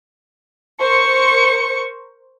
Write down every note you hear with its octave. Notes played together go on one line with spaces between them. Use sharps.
A#4 C5 C#6 C#7